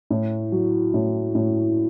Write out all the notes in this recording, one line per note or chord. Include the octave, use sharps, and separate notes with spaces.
A2
F#3
A2
A2